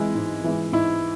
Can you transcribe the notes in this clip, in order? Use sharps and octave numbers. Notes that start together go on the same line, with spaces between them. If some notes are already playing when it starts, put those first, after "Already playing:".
Already playing: E3 G#3 E4
G#2
E3 G#3
G#2 E4